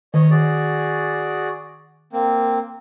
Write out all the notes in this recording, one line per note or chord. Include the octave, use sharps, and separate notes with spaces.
D#3 C#5 D#5
F#4 G#4 D5
A#3 C4